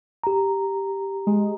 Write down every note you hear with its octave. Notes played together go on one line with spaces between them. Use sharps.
G4 A#5
G#3